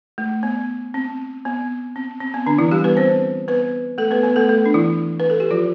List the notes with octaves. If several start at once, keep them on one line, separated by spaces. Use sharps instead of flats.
A3
B3
C4
B3
C4
C4
B3
D3 D4
E3 E4
G3 G4
B3 B4
C4 C5
B3 B4
A3 A4
B3 B4
B3 B4
A3 A4
A3 A4
D4
E3 E4
B4
A4
G4
F3 F4